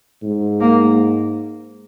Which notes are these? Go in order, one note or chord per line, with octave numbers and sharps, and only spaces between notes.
G#2
A#3